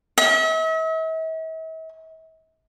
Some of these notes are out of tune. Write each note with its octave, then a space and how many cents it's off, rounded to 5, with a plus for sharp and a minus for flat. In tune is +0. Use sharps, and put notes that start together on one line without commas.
E5 -45